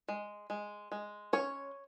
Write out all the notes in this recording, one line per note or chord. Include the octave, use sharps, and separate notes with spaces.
G#3
G#3
G#3
C#4 C#5